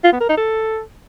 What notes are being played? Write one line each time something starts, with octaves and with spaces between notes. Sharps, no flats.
F4
B3
A#4
D#4
A4